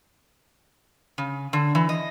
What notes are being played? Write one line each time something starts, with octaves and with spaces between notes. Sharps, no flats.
C#3
D3
E3
D#5